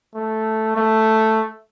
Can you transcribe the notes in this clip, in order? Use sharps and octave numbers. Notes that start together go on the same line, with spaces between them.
A3
A3